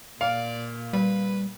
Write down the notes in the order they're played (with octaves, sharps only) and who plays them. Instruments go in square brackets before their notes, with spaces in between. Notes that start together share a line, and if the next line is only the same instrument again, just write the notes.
[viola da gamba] A#2 [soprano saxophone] D5 [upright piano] F5
[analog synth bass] G3 [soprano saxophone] B4